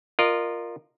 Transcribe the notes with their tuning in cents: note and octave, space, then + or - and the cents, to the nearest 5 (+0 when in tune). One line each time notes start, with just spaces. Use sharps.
F4 +0 A#4 +0 D#5 -35